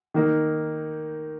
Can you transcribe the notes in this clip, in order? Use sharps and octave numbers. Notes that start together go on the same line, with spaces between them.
D#3 A#3 D#4